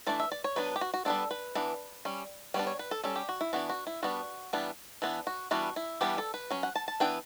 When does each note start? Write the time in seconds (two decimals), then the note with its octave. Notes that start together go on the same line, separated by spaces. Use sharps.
0.07 E3 A3 D4 D5
0.20 E5
0.32 D5
0.44 C#5
0.56 F#3 B3 D4 B4
0.76 G4
0.81 F#4
0.94 F#4
1.05 G3 B3 D4 A4
1.31 B4
1.55 E3 B3 D4
2.05 G3 C#4
2.54 G3 B3 D4 C#5
2.67 C#5
2.79 B4
2.91 A4
3.04 G3 C#4 A4
3.16 G4
3.29 F#4
3.41 E4
3.53 E3 B3 D4 F#4
3.69 F#4
3.87 E4
4.03 G3 B3 D4 F#4
4.53 E3 G3 B3 D4
5.02 E3 B3 D4
5.27 F#4
5.51 E3 G3 B3 D4 F#4
5.76 E4
6.01 E3 G3 B3 D4 G4
6.18 A4
6.34 B4
6.51 F#3 C#4
6.63 F#5
6.75 A5
6.88 A5
7.00 E3 B3 D4 G5